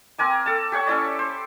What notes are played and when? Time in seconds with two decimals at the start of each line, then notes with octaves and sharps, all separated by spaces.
0.18 C4 A#4 G#5 D6
0.46 A4 A5
0.72 G4 C#5 F#5 C#6
0.87 C#4 E4 D5
1.19 C5